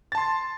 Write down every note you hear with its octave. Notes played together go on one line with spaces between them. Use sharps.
A5 C6 A6